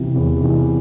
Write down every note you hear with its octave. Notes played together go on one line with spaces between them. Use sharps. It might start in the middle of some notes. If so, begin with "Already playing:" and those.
Already playing: C3 E3
E2
C3 E3